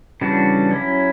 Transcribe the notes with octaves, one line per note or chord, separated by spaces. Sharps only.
C#3 E3 G3 D4 F#4
F#3 C#4 E4